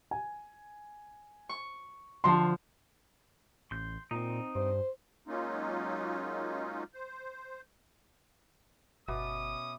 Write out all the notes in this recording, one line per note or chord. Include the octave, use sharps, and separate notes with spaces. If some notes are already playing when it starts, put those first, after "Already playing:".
G#5
C#6
D3 F3 A5 C6
A1 C6 G6
A#2 C4 D#4
G2 C5
F#3 G#3 A#3 C#4 D#4 F4
C5
G1 B2 C#4 E5 B5 D6 D#6